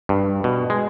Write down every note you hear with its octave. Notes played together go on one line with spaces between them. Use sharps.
G2
B2
G#3